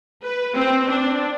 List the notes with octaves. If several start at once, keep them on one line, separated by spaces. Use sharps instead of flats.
B4
C4
D4